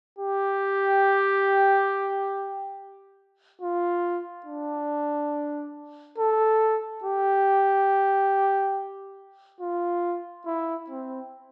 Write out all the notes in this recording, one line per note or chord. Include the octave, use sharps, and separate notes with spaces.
G4
F4
D4
A4
G4
F4
E4
C4